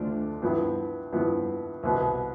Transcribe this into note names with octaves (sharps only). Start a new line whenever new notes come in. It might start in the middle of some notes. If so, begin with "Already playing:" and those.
Already playing: D2 D3 A3 D4 F4
G2 F3 B3 E4
G2 F3 B3 E4
C2 B2 B3